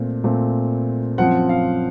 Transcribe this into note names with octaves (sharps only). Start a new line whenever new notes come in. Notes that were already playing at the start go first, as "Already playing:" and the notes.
Already playing: A#2 A3 C4
A#2 A3 C4
F#2 F3 C4 F#5
F5